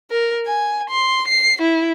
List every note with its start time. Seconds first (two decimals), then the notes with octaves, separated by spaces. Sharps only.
0.11 A#4
0.46 G#5
0.90 C6
1.28 C7
1.61 E4